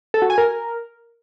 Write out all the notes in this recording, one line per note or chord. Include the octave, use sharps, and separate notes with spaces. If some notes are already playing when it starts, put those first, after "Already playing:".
A4
F#4
G#5
A#4